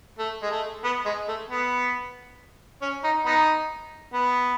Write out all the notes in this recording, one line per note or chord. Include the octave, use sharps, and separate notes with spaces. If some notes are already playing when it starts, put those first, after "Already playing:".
A3
G#3
A3
B3
G#3
A3
B3
C#4
D#4
B3 D#4
B3